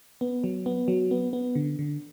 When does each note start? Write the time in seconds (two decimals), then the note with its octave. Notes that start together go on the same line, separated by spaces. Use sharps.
0.21 B3
0.44 F#3
0.66 B3
0.88 F#3
1.11 B3
1.33 B3
1.55 D3
1.79 D3